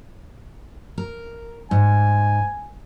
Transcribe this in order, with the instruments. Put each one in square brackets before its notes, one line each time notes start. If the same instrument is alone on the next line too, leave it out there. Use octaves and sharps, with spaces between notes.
[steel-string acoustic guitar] A#4
[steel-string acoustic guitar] G#2 [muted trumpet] G#5